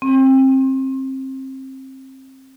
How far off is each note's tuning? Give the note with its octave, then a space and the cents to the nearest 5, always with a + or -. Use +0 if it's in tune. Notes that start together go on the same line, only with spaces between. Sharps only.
C4 +25